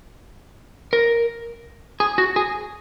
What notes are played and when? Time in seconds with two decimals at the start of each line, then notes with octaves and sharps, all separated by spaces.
0.93 A#4
2.00 G#4
2.18 F#4
2.36 G#4